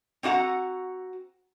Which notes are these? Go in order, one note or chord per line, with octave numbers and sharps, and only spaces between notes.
C4 D4 F#4 F#5 A#5